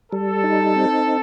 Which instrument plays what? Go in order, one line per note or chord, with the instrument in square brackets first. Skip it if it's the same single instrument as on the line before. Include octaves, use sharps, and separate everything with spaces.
[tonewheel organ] G3 [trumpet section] A4
[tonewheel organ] D#4
C4